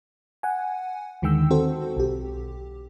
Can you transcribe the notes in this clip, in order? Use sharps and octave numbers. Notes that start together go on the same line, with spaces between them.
F#5 G#5
D#2 D3 D#3 G#3 G5 E6
C4 F#4 A4 C5
B1 G4